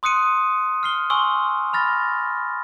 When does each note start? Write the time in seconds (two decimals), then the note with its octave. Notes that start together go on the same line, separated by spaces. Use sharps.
0.03 C6 D#6 F#6 C#7 D#7
0.83 F6 C7 G7
1.10 G#5 C6 C#6 E6
1.73 B5 F6 A6 A#6